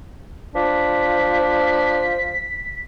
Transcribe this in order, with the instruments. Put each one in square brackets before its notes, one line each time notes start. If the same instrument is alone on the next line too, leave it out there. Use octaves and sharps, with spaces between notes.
[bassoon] F3 [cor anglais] D4 [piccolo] B6